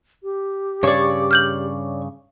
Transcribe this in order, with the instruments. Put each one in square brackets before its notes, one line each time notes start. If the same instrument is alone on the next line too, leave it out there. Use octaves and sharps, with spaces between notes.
[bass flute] G4
[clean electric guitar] G2 C#3 [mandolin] C#5 D5
[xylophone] F6 G6 F#7